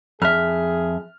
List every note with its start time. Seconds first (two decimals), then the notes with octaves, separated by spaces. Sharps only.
0.22 F2 G#4 E5 F6